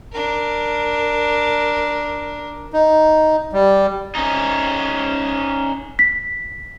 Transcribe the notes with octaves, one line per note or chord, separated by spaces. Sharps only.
D4 A#4
D#4
G3
C#4 D#4
B6